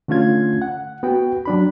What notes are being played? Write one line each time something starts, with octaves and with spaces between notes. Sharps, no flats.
D3 A3 C#4 F4 G#6
F#5
B3 F#4 G5
F#3 D4 B5